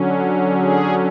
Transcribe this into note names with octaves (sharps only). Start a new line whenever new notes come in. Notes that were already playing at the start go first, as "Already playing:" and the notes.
Already playing: D3 F#3 C#4
G#4